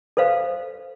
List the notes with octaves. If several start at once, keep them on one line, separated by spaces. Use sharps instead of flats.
A4 B4 C5 F5